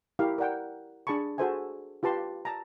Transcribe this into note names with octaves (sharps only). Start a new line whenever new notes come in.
E4 G4 A#4 F5
A#4 D5 F#5 G5
D4 G#4 A5 B5 C#6
F#4 G#4 A4 C5 E5 G#5
F4 G4 B4 A5 C6
A5 A#5